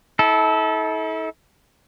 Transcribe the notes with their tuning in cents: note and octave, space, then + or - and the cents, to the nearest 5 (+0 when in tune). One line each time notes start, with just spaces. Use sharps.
E4 -45 A4 -20